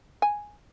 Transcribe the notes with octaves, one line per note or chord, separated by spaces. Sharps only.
G#5